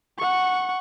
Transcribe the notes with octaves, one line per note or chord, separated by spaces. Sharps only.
F#5 C#6